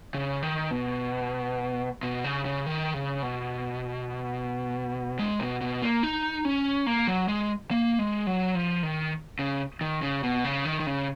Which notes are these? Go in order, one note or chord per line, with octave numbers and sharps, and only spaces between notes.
C#3
D#3
B2
B2
C#3
C#3
D#3
C#3
B2
G#3
B2
B2
A#3
D#4
C#4
A#3
F#3
G#3
A#3
G#3
F#3
F3
D#3
C#3
D#3
C#3
B2
C#3
D#3
D#3
C#3